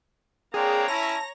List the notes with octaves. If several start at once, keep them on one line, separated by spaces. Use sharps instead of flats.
A#3 C4 D4 G#4 C#5 G5 A#5
C#4 E4 A5 A#6